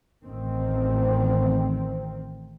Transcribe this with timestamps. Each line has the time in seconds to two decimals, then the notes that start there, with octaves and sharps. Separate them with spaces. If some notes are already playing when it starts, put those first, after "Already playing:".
0.24 A1 D#3 C4